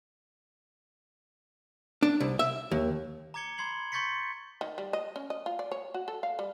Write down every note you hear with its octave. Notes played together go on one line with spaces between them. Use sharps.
D4
C2
E5
D#2
A#5 D6 G#6 C#7 G7
B5 C6 G#6 C7 F#7
C6 C#6 G6 A6 B6 C#7
D#3
G3
D#5
C#4
D#5
F4
D5
C#5
F#4
A4
F5
G3